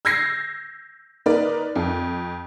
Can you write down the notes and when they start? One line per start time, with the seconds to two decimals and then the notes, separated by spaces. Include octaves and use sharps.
0.05 E6 G6 G#6 A#6 C7
1.26 A#3 D#4 A#4 B4 D5
1.76 F2